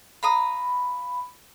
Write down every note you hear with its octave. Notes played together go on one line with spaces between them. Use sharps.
F5 A#5 B5 D#6